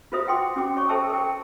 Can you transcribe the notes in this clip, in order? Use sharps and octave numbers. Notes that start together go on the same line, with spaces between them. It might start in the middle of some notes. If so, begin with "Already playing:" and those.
F4 F#4 B4 C5 E5 D#6
F#5 G5 C6 D6
C#4 F#4 G5 D6
C#5 C#6
A4 C5 E5 G5 A5 E6
A#4 G5